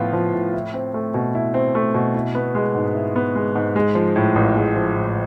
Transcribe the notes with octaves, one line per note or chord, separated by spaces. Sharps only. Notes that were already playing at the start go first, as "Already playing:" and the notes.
Already playing: A2 F3 B3 F4
F3
A2
E4
C4
A3
B2
E4
C4
A3
B2
E4
B3
G#3
G#2
E4
B3
G#3
G#2
G#3
F3
A2
A1
G#3
F3
A2